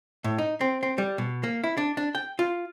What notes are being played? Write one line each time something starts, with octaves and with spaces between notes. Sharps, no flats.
A2
D#4
C4
C4
G3
B2
A#3
E4
D4
D4
G5
F4